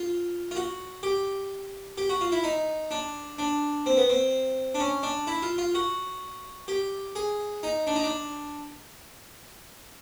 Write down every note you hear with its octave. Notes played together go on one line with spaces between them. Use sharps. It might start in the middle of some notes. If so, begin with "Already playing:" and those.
Already playing: F4
F4
F#4
G4
G4
F#4
F4
E4
D#4
D4
D4
C4
B3
C4
D4
C#4
D4
E4
F4
F4
F#4
G4
G#4
D#4
D4
D#4
D4